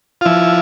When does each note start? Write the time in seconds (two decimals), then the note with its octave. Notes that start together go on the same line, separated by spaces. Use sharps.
0.21 F4
0.25 F3 E4